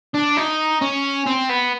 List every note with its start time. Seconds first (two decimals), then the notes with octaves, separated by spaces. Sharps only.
0.14 D4
0.37 D#4
0.81 C#4
1.26 C4
1.49 B3